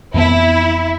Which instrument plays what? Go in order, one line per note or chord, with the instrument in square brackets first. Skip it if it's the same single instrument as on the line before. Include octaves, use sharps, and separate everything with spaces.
[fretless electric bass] F2 E3 B3 [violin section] E4